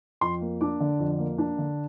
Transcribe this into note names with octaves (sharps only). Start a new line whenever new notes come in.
F2 C6
A#3
D4 D6
D3
F2
A#3
D4
D3